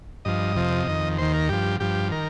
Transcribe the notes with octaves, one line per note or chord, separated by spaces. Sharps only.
G2 F3 D#5
F2 C3 F3
F2 D#3
D#2 D#3 C5
A#4
G2 F3 G4
G2 F3 G4
D#3 A#4